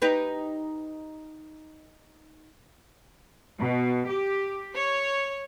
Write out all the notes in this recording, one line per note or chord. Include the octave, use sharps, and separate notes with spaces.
D#4 G4 B4
B2
G4
C#5